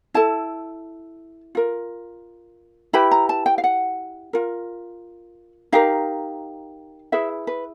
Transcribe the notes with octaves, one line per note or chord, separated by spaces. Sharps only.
E4 A4 A5
F4 A#4
E4 G4 B4 B5
A#5
A5
G5
F5
F#5
F4 A#4
D#4 G4 A#4 F5
E4 G#4 B4 E5
B4